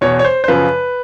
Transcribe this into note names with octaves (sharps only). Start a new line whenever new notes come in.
E2 B2 C#5
C#5
C5
C5
F#2 C#3 F3 B4